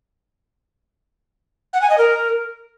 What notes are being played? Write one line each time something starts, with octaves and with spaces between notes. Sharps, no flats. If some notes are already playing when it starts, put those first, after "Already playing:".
F#5
G#5
D#5
A#4